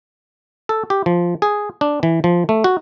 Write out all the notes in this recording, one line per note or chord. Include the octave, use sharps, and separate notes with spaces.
A4
G4
F3
G#4
D4
E3
F3
A3
F#4